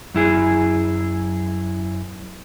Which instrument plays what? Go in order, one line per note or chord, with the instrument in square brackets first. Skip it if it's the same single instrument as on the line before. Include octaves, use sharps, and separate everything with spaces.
[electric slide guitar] F#2 E4 G#4